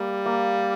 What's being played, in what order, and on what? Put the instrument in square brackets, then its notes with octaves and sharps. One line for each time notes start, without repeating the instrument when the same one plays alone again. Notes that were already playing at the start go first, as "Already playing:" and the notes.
Already playing: [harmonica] G3 [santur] A#3
[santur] A#3